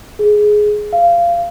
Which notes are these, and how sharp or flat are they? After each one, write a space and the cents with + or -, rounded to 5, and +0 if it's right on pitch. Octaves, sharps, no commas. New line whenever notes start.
G#4 +10
F5 -20